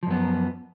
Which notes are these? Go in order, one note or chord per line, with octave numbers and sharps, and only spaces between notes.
F#2 F3 B3